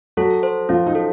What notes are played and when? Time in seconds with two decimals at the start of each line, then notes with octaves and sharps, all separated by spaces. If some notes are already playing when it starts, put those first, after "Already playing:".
0.17 F#3 F#4 A4
0.43 C5
0.69 F3 C#4 F4
0.86 D#4
0.95 A4